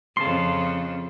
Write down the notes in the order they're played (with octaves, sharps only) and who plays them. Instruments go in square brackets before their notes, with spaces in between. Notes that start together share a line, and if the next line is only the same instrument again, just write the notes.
[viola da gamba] F2 C#3 [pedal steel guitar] A5 C6